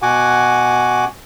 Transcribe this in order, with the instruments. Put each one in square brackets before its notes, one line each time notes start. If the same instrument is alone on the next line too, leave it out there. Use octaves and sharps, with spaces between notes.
[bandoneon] B2 F#4 F#5 G#5 D6